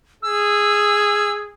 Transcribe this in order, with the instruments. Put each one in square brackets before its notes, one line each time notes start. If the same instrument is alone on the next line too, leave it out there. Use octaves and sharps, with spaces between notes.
[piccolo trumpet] G#4 [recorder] E6